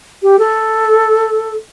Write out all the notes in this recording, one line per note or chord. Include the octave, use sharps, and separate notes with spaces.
G4
A4